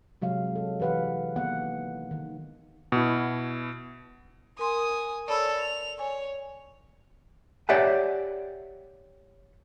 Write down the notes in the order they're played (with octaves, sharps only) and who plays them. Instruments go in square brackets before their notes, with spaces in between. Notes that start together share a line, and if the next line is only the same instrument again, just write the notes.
[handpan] C3 F#3 G#3 F5
A4
E3 G4 B4 F5 F#5
D#3 A#3 B3 F#5
D#3
[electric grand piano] B2 E4
[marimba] A#4 C6 [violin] G#5 D#6
[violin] A4 C#5 [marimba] D5 B5 E6
[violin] F7
[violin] C#5 [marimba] G#5
[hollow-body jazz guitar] G4 C#5 D5 E5 F#5 G#5